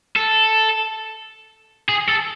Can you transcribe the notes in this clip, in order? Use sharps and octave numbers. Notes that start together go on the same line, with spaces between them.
A4
G#4
A4